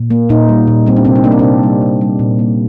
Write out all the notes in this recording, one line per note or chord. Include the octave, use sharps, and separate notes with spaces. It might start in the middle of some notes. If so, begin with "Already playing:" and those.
Already playing: A#2
A#3
A#2 D#4
G3
A#2
G3 C4
D4
C3 C4
D#4
A#3 D4
C4
C3 D4
G3
C3
G3
A#2
A#3